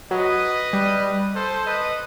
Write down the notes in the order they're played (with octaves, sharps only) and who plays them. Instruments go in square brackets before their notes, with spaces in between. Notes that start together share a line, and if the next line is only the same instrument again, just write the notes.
[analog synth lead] F#3 [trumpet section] B4 D#5
[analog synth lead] G3
[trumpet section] A4 C5
B4 D#5